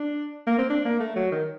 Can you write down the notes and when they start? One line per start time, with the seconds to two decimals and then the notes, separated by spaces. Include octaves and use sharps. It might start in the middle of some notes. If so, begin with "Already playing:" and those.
Already playing: D4
0.47 A#3
0.58 C4
0.70 D4
0.85 A#3
1.00 A3
1.16 F#3
1.31 D#3